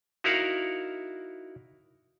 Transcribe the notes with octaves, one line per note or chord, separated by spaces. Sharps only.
D#4 E4 F#4 A#4 F5 F#5